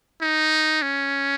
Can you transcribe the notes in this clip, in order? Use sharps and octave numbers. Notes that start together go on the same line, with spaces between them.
D#4
C#4